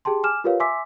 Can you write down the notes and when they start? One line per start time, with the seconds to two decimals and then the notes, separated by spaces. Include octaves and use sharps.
0.05 G4 G#4 G5 A5 C6
0.24 G#5 D6 F6 E7
0.44 F4 G4 A#4 B4 C#5 F5
0.60 E5 G#5 C6 D6 E6 B6